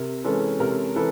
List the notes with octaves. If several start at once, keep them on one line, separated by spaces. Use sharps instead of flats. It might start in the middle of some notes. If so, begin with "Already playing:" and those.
Already playing: C3 A#4
E3 G#3 C#4 A4 B4
C3 A#4
E3 A4 B4